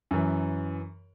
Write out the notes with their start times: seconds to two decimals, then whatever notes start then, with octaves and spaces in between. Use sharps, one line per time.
0.11 F#2 E3